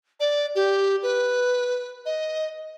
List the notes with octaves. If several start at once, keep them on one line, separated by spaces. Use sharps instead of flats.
D5
G4
B4
D#5